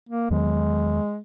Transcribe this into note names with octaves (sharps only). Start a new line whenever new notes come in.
A#3
E2 D#3 F#3 G#3 B3